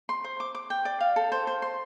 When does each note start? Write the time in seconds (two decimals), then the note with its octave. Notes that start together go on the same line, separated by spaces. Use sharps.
0.09 C6
0.24 C5
0.40 D6
0.55 D6
0.70 G5
0.85 D5
1.01 F5
1.16 A4
1.32 C5
1.47 C5
1.62 C6